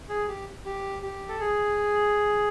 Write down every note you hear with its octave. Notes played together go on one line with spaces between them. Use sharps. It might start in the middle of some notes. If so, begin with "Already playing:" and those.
G#4
G4
G4
G4
A4
G#4